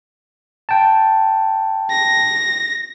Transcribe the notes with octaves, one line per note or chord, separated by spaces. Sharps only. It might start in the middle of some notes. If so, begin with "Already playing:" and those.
G5 A5
A#6